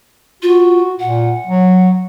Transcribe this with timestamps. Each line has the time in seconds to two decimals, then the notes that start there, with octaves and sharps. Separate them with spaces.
0.43 F4 F#4
1.00 A#2 F#5
1.47 F#3